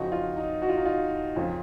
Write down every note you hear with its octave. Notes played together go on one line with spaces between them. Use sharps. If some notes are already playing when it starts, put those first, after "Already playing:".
Already playing: F2 C#3 F3 D#4 F#4
F4
D#4
F#4
F4
D#4
F4
F2 C#3 F3